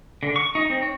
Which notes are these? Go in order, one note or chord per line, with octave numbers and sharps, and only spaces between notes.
D3
C#6
D#4
C4
C#5